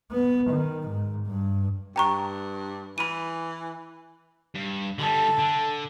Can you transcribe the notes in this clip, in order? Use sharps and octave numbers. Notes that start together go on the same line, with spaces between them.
B3
D#3
G#2
G2
G2 G5 A#5 C#6
E3 B5 D#7
G2
D3 G3 A4
D3